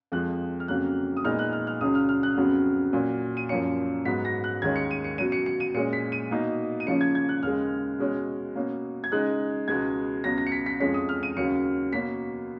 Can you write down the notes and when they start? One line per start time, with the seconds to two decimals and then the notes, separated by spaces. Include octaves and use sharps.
0.12 F2 F3 G#3 F#6
0.60 F6
0.68 F2 C#3 F#3 A#3 F#6
1.17 D#6
1.24 A#2 G#3 B3 D#4 F6
1.39 F#6
1.53 F6
1.67 F6
1.81 C#2 C#3 F#3 D#6
1.95 F6
2.09 F6
2.23 F#6
2.37 F2 C#3 F#3 B3
2.93 A#2 F#3 C#4
3.37 D#7
3.49 F#2 F3 A#3 C#4 C#7
4.05 G#2 F#3 B3 B6
4.25 A#6
4.44 F#6
4.62 D#2 D#3 G#3 C#4 G#6
4.76 C#7
4.91 D#7
5.04 C#7
5.18 B2 F#3 C#4 D#7
5.32 C#7
5.46 C#7
5.60 D#7
5.74 A#2 G#3 C#4 C#7
5.93 B6
6.12 D#7
6.31 B2 A#3 D#4
6.80 D#7
6.87 C#3 F3 A#3 C#4 C#7
7.01 G#6
7.15 G#6
7.29 F#6
7.43 D#2 C#3 G#3 F6
7.99 B2 G#3 C#4
8.55 B2 A#3 C#4
9.04 G#6
9.11 C#3 G#3 D#4 F#6
9.68 C#2 B2 G#3 B3 G#6
10.24 C#2 B2 F#3 B3 A#6
10.38 A#6
10.47 C#7
10.52 B6
10.66 B6
10.80 F2 F3 G#3 C#4 B6
10.94 D#6
11.09 F6
11.23 D#7
11.36 D#2 C#3 F#3 C#7
11.93 B2 A#3 C#4 B6